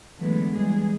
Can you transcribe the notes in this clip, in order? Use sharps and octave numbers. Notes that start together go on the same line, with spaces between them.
D3 E3 F#3 G#3 A3 B3
E2 G3 G#3 G#4